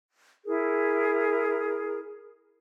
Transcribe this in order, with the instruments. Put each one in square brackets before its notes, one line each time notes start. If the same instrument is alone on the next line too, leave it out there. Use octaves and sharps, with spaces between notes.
[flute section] E4 G#4 A#4